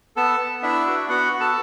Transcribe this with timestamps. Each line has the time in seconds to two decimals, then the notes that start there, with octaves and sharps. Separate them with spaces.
0.16 B3 A4 A5
0.40 B3
0.63 D4 E4 E5
0.86 F#4
1.09 B3 F#4 F#5
1.33 F#4
1.40 A4 A5